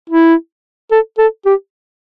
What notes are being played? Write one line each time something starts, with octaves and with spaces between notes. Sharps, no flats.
E4
A4
A4
G4